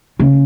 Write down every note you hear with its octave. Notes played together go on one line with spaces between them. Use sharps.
C#3